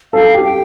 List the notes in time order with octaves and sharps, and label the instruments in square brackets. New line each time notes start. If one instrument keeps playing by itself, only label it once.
[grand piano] A4 [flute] F5
[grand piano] G4
[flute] G5